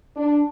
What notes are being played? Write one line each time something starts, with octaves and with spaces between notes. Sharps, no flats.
D4